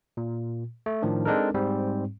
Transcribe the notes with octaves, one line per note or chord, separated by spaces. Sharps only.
A#2
A3
A2 D#3 F3 D4
G#3 C4 D4 D#4 A4 A#4
G#2 G3 C4